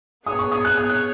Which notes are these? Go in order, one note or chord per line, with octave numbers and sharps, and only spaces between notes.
B3 G#4 C#5 D#6
C#6
D#6
F#6
D#6
F#6